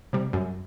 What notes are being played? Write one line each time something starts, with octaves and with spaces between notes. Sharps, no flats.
C3 G3
F#2